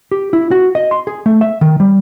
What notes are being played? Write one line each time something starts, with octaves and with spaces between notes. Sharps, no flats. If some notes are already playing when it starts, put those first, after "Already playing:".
G4
E4
F#4
D#5
C6
G#4
A3
E5
D#3
G3